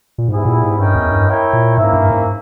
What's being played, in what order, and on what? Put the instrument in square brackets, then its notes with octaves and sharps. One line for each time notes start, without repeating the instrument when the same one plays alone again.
[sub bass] A#2
[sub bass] G#2 [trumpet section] G3 B3 E4 G#4
[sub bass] A#2
G#2
[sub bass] G2 [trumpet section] C#4 E4 A#4 D#5 G5
[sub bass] E2
G2
[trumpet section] E4 A#4 C#5 E5 G5
[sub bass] A#2
[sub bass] G#2 [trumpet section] A#3 C#4 E4 A#4 E5
[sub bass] G2
G#2